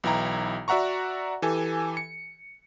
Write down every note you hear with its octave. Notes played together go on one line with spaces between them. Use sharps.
B1 E3 E4 G5 A#5
F#4 D5 E5 F#5 A#5 C#6
E3 G4 A4 G#5
C#7